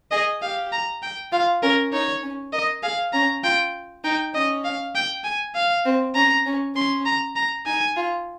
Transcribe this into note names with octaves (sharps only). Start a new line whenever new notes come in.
G#4 D#5
G4 F5
A#5
G5
F4 F5
C#4 A#4
D#4 C#5
C#4
A#4 D#5
G#4 F5
C#4 A#5
F4 G5
D#4 G5
C#4 D#5
F5
G5
G#5
F5
C4
C#4 A#5
C#4
C#4 C6
A#5
A#5
D#4 G#5
F4